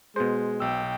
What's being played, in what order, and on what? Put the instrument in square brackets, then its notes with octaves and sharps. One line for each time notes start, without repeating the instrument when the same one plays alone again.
[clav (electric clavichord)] B2 C5 [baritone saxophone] G#3
[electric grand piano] B1 E6 [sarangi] G5